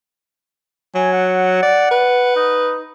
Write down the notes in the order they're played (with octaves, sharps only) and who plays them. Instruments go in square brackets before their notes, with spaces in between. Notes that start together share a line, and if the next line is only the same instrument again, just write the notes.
[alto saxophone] F#3 [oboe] G#5
[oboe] F#5
[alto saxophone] D5
B4
[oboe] D#4